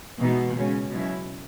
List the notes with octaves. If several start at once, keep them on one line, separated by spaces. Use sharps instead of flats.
B2 E3 G#3 B3 D#4
C#3 G#3 C#4
B2 F#3 C#4 E4